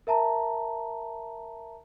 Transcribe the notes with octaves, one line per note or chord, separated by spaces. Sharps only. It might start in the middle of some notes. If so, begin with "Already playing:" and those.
A#4 E5 A5 A#5